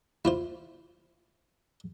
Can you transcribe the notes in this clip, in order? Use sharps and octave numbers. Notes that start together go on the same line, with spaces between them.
E4 F4 C5